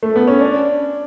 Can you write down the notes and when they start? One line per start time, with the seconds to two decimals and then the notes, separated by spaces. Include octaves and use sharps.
0.03 A3
0.16 B3
0.28 C#4
0.40 D4